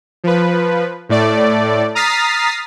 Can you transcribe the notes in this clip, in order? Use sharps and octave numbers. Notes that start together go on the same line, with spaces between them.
F3 B4
A2 A3 D5
A#5 D#6 F6 A6 B6 C7